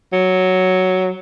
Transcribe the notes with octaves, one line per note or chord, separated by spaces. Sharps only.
F#3